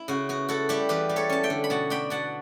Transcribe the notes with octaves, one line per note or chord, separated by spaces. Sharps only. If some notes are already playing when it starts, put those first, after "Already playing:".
Already playing: E4
C#3 F#4
B3 F#4
E4 F#4 A4
G3 E4 G4
E2 G4 B4
G3
A4 C#5
C#4 A5
E5 G5
D3
B5
B2 F#5 A5
D4 G5 B5
B2 F#5 A5